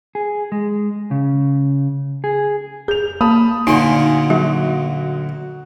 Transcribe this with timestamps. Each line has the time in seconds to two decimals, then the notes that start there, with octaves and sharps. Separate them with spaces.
0.15 G#4
0.52 G#3
1.11 C#3
2.24 G#4
2.88 G#4 G6 F7
3.21 A#3 A5 B5 D#6
3.67 D2 A#2 D#4 F#5 G#5 C6
4.30 F#3 F#4